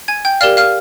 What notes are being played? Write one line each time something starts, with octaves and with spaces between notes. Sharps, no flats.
G#5 G#6
G5 G6
G4 A#4 D5 F5 F6
F5 F6